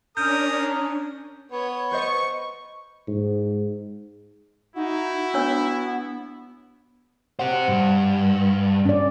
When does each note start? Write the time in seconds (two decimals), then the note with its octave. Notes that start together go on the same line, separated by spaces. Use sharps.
0.17 C#4 D4 A#4 D#6 G6
1.52 B3 C#5
1.92 B4 C5 D#5 C#6
3.08 G#2
4.76 D#4 E4 F#4
5.34 B3 D4 C#5 E6
7.39 G4 C5 F#5
7.68 G2
8.85 C#4 D5